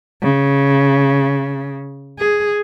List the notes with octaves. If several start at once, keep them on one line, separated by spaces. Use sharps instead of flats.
C#3
G#4